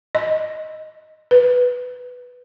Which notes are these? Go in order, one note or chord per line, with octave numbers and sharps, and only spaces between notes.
D#5
B4